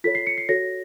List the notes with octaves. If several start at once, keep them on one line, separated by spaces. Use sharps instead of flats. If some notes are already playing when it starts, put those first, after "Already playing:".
F4 A4 C#5 B6
C7
C#7
C7
F#4 A4 C#5 A#6